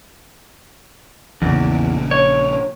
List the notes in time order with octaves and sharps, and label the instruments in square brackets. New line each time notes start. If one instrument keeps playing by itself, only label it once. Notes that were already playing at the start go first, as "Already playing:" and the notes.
[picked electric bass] A#1 A#2 C#3 [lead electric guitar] E2
[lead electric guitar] C#5